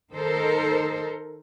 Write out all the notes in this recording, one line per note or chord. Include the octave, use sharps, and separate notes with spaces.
D#3 D#4 A4 A#4 C5